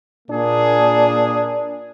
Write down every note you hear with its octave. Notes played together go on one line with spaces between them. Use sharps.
A#2 A#3 D4 G#4